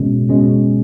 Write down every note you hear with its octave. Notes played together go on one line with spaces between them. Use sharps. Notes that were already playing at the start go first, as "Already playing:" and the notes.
Already playing: B2 G#3 C#4
B2 G#3 C#4